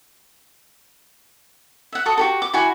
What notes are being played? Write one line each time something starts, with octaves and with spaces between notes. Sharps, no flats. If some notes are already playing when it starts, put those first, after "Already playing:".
E5 F#5
F#4 A4 D#6
F#4 G4 A4
D6
E4 F#4 G#5